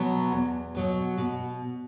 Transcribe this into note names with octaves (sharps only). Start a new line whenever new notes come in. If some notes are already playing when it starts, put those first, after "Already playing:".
Already playing: B2 F#3 B3
E2
B2 F#3 B3
B2